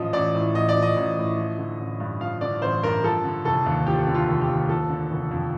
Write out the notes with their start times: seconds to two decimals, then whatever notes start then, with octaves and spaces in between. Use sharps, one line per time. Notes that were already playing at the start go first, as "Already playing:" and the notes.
Already playing: A1 F3 D#5
0.13 A1 D5
0.35 A2
0.54 A1 D#5
0.69 D5
0.76 F3
0.82 D#5
0.97 A1
1.17 A2
1.38 F3
1.58 D3
1.80 A1
2.00 G2
2.20 F3 F5
2.41 D3 D5
2.61 A1 C5
2.83 G2 A#4
3.04 F3 A4
3.24 D3
3.44 F1 A4
3.66 D#2
3.86 F3 G4
4.07 D3
4.14 F4
4.28 F1
4.41 G4
4.48 D#2
4.69 F3 A4
4.89 D3
5.11 F1
5.31 F2